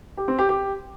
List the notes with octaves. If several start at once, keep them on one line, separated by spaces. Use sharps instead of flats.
G4
C4
G4
G4